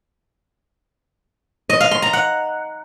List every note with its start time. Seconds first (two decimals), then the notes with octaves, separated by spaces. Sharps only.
1.69 D#5
1.80 F5
1.91 C6
2.02 A#5
2.13 F#5